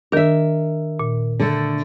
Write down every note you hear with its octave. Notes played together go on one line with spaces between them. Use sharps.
D#3 D4 A#4 E5
A#2
D3 A3